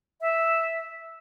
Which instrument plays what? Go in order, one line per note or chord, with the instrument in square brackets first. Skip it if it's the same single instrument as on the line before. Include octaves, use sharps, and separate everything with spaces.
[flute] E5